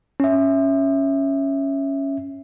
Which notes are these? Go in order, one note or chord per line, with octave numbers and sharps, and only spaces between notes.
C#4 E5